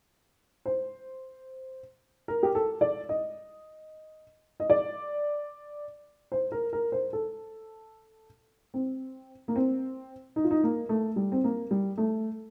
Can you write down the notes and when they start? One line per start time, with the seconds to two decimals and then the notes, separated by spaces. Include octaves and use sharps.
0.66 C5
2.28 A#4
2.43 G4
2.55 A4
2.81 D5
3.09 D#5
4.60 D#5
4.70 D5
6.32 C5
6.52 A#4
6.73 A#4
6.92 C5
7.13 A4
8.74 C4
9.48 A#3
9.56 C4
10.36 D#4
10.44 F4
10.51 D#4
10.64 A#3
10.89 A3
11.16 G3
11.32 C4
11.44 A#3
11.71 G3
11.98 A3